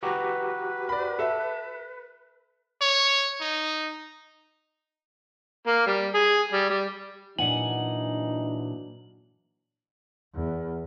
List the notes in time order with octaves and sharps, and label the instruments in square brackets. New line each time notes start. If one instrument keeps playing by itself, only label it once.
[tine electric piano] F#4 G4 A#5 [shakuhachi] B4
[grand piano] D5 B5
A4 E5
[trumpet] C#5
D#4
[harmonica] A#3
G3
G#4
G3
G3
[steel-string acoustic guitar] A#2 F#5 G#5 [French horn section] E3 F#3 D4 [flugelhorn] D#4 [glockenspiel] F#7
[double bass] E2